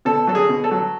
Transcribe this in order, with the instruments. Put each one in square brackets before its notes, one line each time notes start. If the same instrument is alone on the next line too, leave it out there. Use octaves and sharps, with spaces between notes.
[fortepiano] B2 A4
F#3 A4
G#4
B2
A4
F#3